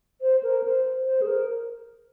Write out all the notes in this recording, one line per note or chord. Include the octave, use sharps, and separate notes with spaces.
C5
A#4
C5
C5
G#4
A#4